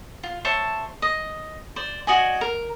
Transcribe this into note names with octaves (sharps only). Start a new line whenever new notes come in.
F4
C5 C#5 E5 A5
D#5
C5 D5
F#4 D5 D#5 G#5
A#4